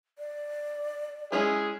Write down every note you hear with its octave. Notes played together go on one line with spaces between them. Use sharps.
D5
G#3 C#4 E4 G#4